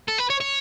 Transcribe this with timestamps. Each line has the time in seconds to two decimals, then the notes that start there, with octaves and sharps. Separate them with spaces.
0.08 A4
0.18 B4
0.30 C#5
0.40 C#5